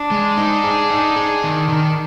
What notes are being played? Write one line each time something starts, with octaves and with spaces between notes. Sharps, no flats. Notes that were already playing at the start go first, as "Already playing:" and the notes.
Already playing: D4
G#3
D#4
G#4
D#4
G#4
D#3
D#3